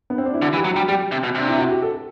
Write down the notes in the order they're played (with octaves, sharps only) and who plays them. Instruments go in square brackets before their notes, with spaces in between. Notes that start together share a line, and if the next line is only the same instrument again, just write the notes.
[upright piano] B3
C4
D4
E4
[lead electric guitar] D3 [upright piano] F#4
[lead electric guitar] E3
[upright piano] G4
[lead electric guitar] F#3
[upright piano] F#4
[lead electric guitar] G3
[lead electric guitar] G3 [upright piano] G4
[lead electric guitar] C3
B2
[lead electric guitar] C3 [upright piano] D4
[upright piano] E4
F#4
G4
A4